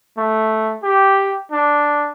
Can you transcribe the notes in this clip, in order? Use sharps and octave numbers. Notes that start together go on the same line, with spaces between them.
A3
G4
D4